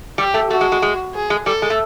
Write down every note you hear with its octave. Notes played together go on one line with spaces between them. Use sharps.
G3 G4
A3
A3 F#4
G#3
G#3
G#3
G#4
G#3
G3 A4
G#3
A3